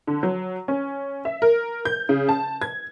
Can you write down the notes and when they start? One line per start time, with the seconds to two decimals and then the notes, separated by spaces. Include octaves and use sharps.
0.07 D3
0.23 F#3
0.68 C#4
1.25 E5
1.42 A#4
1.85 G6
2.09 C#3
2.29 A5
2.62 G#6